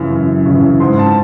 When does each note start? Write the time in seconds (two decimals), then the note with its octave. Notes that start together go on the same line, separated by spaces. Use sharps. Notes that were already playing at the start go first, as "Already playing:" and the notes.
Already playing: F#2 C#3 E3
0.10 F#2
0.46 C#3 E3
0.80 G#2 C6
0.99 A5